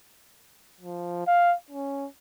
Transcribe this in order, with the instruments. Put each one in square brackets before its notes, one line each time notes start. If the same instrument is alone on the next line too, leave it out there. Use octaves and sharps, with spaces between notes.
[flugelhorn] F3
F5
C#4